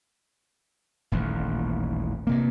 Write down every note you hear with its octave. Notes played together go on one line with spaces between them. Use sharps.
D#1 A1 D#2
G2 C3 A#3